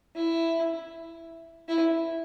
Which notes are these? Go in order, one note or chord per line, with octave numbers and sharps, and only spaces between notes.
E4
E4